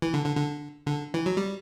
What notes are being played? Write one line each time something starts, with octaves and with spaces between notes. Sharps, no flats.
E3
D3
D3
D3
D3
E3
F#3
G3